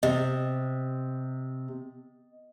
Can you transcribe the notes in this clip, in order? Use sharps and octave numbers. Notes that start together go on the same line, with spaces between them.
C3 D#5